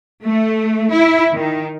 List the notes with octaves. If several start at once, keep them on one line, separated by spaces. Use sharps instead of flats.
A3
E4
D#3